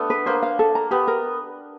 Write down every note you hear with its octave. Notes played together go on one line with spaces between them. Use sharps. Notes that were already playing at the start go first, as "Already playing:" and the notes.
Already playing: A3 B3 D4
B4
A#3 C5
F5
A4
A#5
B3 G4
A#4